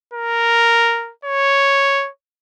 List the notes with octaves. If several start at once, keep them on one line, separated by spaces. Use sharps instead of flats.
A#4
C#5